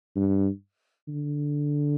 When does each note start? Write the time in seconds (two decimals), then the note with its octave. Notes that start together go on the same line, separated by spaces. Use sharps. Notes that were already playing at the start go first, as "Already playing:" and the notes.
0.16 G2
1.08 D3